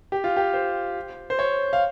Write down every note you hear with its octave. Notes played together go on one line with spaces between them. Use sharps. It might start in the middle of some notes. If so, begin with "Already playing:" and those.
G4
F4
G4
C5
C5
C#5
F5